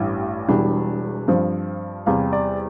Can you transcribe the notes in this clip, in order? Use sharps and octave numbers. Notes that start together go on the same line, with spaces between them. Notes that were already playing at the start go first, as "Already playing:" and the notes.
Already playing: A1 G2 E3 G3
E1 E2 E3 G3 D4
G2 F3 C4
E2 C3 G3 F5
D5